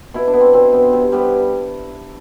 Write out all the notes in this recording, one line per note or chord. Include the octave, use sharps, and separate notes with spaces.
B2 E4
D4
B3
C4
B2 C4
B3
C3
G3 B3